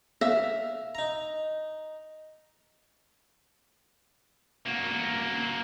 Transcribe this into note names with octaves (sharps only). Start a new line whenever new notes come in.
E5 F5
D#4 A#5
A#3 F#4